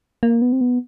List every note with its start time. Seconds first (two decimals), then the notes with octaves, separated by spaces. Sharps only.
0.23 A#3
0.42 B3
0.53 C4
0.61 B3